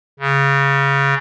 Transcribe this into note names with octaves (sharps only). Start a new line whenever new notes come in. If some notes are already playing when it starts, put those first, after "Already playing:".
C#3